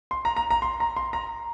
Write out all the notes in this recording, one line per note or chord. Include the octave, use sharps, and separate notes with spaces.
C6
A#5
A#5
A#5
C6
A#5
C6
A#5